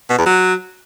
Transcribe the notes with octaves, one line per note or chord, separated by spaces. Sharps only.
B2
E2
F#3